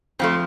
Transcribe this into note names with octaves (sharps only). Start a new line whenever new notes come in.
F2 F3 A3 C4